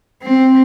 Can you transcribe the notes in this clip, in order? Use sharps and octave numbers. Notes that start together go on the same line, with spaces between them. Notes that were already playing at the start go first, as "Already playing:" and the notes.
C4